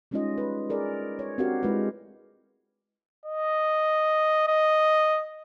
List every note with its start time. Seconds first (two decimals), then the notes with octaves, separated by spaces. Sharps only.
0.11 G3 G#3 C#4 D#4 F4 D#5
0.38 B4
0.70 G#4 A#4 D5
1.19 C#5
1.38 C4 D4 F#4 G4 A#4 F5
1.63 G#3 E4 F4 B4
3.26 D#5
4.48 D#5